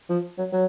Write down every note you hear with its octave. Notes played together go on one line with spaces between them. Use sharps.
F3
F#3
F#3